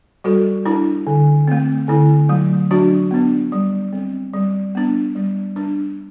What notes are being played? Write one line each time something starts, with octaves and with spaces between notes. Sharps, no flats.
G3 F#4 A4
D4 E4
D3
A3 C4
D3 E4
F#3 A3
F#3 D4 F#4
B3 D4
G3
C4
G3
B3 D4
G3
D4